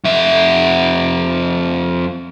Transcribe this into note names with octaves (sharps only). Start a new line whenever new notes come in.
F2 E5